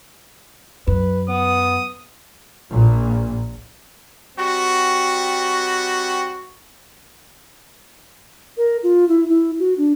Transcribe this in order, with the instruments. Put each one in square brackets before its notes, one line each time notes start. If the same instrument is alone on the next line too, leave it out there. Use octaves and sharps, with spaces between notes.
[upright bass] F#2 [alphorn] B4
[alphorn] B3 [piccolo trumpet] D#6
[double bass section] A#1 A#2
[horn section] G3 C4 F#4
[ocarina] A#4
F4
E4
E4
F#4
D4